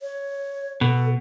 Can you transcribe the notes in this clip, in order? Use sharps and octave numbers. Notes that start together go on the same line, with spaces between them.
C#5
B2 A4